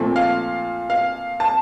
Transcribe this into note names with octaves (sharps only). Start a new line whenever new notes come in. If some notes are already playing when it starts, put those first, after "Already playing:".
Already playing: A#2 F3 A3 C4
F5
F5
A5